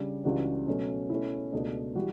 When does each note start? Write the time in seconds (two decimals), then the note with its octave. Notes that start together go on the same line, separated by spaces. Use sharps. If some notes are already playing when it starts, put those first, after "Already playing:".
Already playing: C#3 G3 D4
0.24 C#2 C#3 E3 G3 D4 F#4
0.67 B2 F#3 A3 C#4
1.10 B2 A3 C#4 E4
1.52 C#2 B2 A3 D4
1.95 E3 G3 F#4